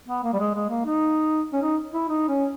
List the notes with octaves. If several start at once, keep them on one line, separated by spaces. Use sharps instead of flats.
B3
A#3
G3
G#3
G#3
A#3
D#4
C#4
D#4
E4
D#4
C#4